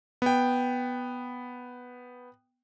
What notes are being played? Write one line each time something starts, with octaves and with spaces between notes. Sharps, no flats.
B3 G5